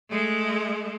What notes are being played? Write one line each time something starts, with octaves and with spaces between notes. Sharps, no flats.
G#3 A3